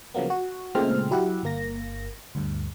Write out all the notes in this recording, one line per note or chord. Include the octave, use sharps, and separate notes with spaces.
C#3 F3 F#3 A#3 B3
F#4
A#2 C#3 G#3 A3 C4 F6
F#3 E4 G4 E5 F#5
G1 A#3 A#6
D2 G2